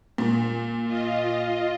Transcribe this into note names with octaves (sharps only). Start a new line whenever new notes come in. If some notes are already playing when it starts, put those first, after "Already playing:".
A#2
F4 D#5